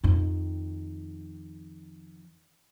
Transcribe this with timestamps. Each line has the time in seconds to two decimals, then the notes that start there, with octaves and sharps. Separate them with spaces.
0.04 F2 D#3